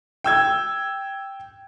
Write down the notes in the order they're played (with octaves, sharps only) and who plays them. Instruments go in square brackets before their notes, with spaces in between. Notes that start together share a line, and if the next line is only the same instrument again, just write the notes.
[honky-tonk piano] G5 E6 G#6